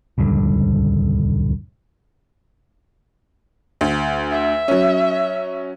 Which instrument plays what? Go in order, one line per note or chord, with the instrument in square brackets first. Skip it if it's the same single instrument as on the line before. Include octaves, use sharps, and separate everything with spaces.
[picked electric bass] D#1 C#2 G2 D3
[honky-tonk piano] D2
[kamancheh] E5
[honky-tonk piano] F#3 C#4